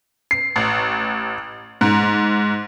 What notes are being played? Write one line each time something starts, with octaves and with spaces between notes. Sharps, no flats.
C7
A1
G#2